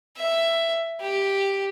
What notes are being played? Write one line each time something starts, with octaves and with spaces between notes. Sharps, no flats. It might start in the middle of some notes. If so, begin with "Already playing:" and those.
E5
G4